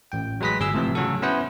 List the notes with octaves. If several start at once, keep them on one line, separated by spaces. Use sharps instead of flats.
A1 G5
F#3 G#3 B4 D#5 B6
G1 G#4 E6
A2 C3 E3 F3
C#3 F#3 C#4 F#4 A4
B3 C#4 E4 B4 C5 F#5